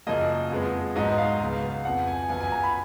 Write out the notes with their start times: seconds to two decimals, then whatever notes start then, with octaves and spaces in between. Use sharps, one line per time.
0.07 F#2 C#3 F3 A#3 D#5
0.51 F2 F3 G#3 B3
0.96 G#2 F#3 B3 D#5
1.18 F5
1.40 C#2 C#3 F#3 B3
1.85 F2 F3 B3 F#5
2.07 G#5
2.29 F#2 F3 B3 G#5
2.40 G#5
2.52 A#5
2.63 B5